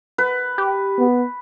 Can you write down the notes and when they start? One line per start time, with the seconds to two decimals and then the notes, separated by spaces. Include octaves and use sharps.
0.18 B4
0.58 G4
0.98 B3